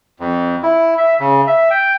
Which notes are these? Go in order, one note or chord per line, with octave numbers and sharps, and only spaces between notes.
F2
E4
E5
C#3
E5
G5